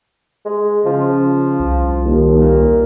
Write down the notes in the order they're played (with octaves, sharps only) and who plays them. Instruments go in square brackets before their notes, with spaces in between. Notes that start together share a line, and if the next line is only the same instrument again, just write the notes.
[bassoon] G#3
[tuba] C#3 [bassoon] F3
[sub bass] C2
[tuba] D#2
[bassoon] A#2